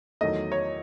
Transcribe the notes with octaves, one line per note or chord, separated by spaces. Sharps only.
E2 D#3 F#3 A3 D#5
C#5